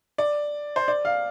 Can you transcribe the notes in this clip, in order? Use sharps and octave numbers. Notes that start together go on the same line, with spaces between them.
D5
C5
D5
F5